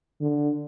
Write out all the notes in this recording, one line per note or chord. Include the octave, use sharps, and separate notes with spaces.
D3